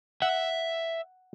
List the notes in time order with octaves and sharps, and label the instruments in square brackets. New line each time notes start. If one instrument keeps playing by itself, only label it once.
[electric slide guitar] E5 [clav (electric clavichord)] F#5